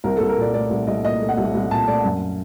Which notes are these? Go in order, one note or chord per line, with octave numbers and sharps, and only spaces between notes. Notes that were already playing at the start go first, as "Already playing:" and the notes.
C2 A#4
C2 A4
A#4
A#2 D5
A3 D5
C2
C2 D#5
A#2 D#5
A3
F#5
C2
C2
A#2 A5
A3 D5
F#2